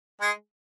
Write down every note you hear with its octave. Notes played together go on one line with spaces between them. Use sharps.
G#3 G#4